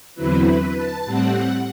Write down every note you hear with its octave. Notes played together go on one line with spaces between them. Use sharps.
E2 D3 F#3 C4 E4 B4
B4
A5
A2 G3 C4 F#5